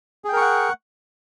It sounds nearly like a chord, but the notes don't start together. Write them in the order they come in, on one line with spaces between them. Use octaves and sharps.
G#4 G5 A#4 C#6 F#5